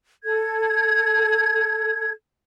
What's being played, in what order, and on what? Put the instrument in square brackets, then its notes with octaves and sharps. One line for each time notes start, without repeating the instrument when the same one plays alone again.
[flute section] A4 G#6